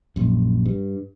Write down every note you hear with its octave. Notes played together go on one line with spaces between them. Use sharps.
A#1 F#2
G2